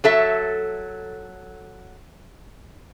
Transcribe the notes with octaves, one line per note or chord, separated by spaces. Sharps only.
F#3 A4 E5